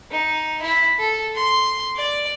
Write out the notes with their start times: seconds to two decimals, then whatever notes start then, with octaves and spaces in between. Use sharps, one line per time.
0.11 D#4
0.62 E4
0.99 A4
1.35 C6
1.96 D5